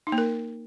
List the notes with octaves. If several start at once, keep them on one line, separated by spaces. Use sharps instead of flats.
D#4
A#3
A#4